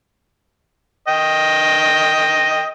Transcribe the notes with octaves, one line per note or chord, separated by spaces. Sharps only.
D#5 G5